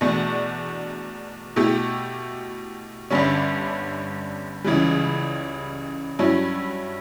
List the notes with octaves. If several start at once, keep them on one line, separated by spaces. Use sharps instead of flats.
E2 B2 A3 D4
B2 A3 E4 G4
G1 G2 D3 G3 C#4
C#2 C#3 E3 G3
G2 F#3 C#4 E4